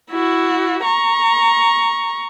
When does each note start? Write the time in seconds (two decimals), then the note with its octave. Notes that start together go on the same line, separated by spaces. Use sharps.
0.11 E4 F#4
0.84 A#5 C#6